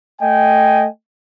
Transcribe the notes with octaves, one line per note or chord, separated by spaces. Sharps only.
A3 D#5 G5 G#5